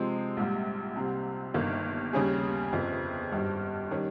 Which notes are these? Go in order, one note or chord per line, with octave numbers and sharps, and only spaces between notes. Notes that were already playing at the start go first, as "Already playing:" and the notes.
Already playing: C3 F3 G#3 C4
A#1 G#2 G3
C2 C3 G3 C4
G1 G2 D#3 A#3
D#2 C#3 G3 C#4 G#4
G1 F2 C#3
G#1 G2 G3
D#3 G3 C#4